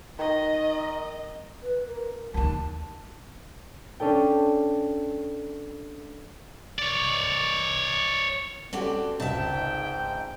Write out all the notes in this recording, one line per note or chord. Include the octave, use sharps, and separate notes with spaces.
D#3 D#5
B4
A#4
D#2 D#3 A5
C#4 D4 A4 G5
C#5 D5
C4 C#4 F#4 G4 A4 D5
G#1 C#2 G#2 C3 E5 G5 A5